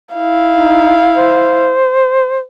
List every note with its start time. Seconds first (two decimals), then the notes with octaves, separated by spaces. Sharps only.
0.15 E4 F5
0.51 D#4
1.16 C5